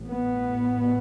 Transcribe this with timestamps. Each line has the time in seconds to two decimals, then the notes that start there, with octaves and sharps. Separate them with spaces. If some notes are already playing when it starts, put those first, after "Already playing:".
Already playing: A1 A2
0.08 B3